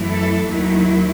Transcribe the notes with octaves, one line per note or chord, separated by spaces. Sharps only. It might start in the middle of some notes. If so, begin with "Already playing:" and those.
Already playing: F#2 E3 A3 E4
A4
D#2 D#3 F#3 A3 E4